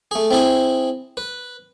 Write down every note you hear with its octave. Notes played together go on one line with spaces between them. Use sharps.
A3 G#4
C4 E4 G#4
B4